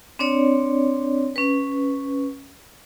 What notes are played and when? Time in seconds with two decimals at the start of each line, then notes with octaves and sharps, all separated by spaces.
0.19 C4 D4 C#5 D5
1.36 C#4 B4